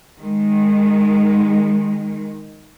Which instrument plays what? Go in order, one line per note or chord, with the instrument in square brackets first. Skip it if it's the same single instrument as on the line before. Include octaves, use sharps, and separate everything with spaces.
[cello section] D#3 G#3